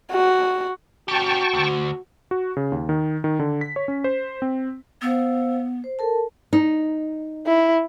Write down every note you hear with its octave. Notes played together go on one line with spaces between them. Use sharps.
F#4
C#4 F#4 G4 G5 A5 C#6
D2
F#4
C#3
D#2
D#3
D#3
D3
B6
C#5
C#4
C5
C4
B3 C5 F5 E6
C5
A4 A#4 A5
D#4
E4